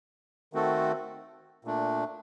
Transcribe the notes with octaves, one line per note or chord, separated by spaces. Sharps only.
D#3 A3 C4 F#4 A4
A#2 A3 D4